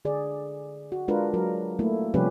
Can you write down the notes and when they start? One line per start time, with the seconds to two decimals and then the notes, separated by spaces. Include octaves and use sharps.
0.05 D3 G#4 D5
0.92 F#4
1.08 G#3 D4 F4 A#4 B4
1.34 F#3 A#4
1.79 A3 A#3 E4
2.14 C3 F3 G3 C#4 G4 B4